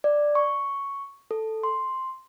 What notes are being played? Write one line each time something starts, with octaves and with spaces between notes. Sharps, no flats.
D5
C#6
A4
C6